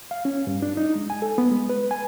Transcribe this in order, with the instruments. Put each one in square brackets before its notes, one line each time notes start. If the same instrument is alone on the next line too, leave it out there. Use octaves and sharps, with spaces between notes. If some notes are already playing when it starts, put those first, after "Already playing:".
[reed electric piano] F5
C#4
G2
D4
D#4
G#3
G#5
A4
B3
G#3
B4
G#5